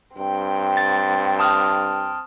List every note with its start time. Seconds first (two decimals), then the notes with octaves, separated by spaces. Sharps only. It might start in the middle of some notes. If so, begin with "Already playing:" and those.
0.17 G2 C4 G5
0.77 A6
1.39 A5 D#6 F6